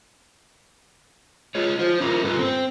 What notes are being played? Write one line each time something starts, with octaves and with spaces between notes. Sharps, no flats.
F4 G#4 C#5
F4 C5
D4 E4 F4 A#4
G2 A4 B4
C4 C5